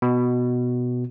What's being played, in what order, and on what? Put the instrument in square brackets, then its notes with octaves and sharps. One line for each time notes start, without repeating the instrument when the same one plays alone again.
[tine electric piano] B2